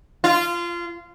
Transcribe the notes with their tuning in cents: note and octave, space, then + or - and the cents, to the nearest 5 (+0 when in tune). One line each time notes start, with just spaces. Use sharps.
F4 -20